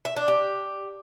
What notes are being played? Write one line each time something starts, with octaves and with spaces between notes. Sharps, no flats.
E5
D4
G4